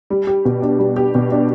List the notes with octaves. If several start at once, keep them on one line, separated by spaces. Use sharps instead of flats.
G3
G4
B2
D4
G3
G4
B2
D4